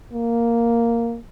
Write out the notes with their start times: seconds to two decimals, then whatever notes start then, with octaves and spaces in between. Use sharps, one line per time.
0.13 A#3